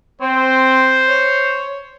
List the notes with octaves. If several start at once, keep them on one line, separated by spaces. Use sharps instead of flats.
C4 C5
C#5